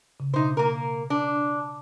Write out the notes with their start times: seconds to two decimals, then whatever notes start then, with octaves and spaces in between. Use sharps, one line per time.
0.20 C#3
0.34 B2 D#4 C5
0.57 A#3 A#4
1.10 D4